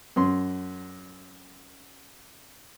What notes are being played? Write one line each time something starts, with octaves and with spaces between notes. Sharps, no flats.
F#2 C6